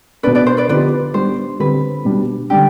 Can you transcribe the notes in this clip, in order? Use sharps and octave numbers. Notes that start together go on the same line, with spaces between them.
B2 B3 D4 B4 D5
B4 D5
C5
B4 D5
D3 F3 B3 D#4 G4 B4 D5
G3 B3 D4 C5
D3 G3 C4 G4 B4
B2 G3 D4
D3 G3 D4 G4